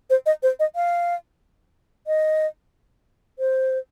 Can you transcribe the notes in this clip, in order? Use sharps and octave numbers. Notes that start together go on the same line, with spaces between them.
C5
D#5
C5
D#5
F5
D#5
C5